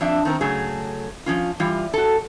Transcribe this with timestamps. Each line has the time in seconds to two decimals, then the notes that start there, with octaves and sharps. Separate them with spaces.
0.01 F2 D4 E5
0.25 D#3 C4 A#4
0.41 C#3 F#3 A3 G#4
1.26 F3 C#4 F4
1.60 E3 G3 F4
1.94 F#4 A4